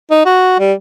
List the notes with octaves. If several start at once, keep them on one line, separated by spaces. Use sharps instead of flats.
D#4
F#4
G3